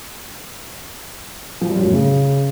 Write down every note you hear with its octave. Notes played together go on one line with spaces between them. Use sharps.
F3
G3
F#2
A2
C#3